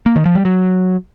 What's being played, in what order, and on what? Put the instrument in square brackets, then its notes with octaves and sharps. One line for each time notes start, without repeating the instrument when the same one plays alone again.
[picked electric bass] A#3
D#3
F3
G3
F#3